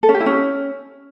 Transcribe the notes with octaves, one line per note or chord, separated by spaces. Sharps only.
A4
C#4
G4
E4
C#4